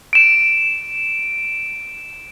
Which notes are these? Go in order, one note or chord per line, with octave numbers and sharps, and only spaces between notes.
D7 E7